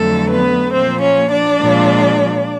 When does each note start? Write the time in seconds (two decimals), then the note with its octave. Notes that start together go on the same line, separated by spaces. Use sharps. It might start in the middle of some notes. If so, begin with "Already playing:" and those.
Already playing: F2 D3 F#3 A3 A4
0.30 B3 B4
0.73 A#2 F3 A#3 C4 C5
1.02 C#4 C#5
1.30 D4 D5
1.59 A#2 F3 G#3